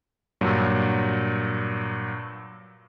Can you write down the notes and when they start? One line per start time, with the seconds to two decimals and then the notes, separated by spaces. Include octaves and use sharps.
0.41 G2 A#2 F#3